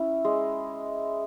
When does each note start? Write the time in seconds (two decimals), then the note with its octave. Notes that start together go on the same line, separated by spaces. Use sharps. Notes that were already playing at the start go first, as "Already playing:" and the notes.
Already playing: C#4 E4
0.25 G#3